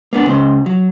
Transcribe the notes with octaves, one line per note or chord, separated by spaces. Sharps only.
A#3 B3 D4
C#2 C#3 C5
F#3